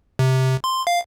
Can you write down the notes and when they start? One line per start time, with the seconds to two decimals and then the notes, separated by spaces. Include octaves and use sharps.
0.19 C3
0.64 C6
0.87 F5